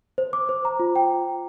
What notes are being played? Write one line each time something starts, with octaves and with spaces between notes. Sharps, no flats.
C5
D6
C5
A#5
F4
G5